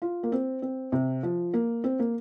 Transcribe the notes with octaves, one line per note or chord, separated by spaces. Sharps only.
F4
A#3
C4
C4
C3
F3
A#3
C4
A#3